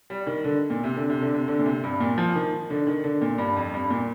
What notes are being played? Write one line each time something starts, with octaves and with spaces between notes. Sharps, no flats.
G3
D#3
D3
A#2
C3
D3
C3
D3
C3
D3
A#2
C3
G2
A#2
F3
D#3
D3
D#3
D3
A#2
G2
F2
G2
A#2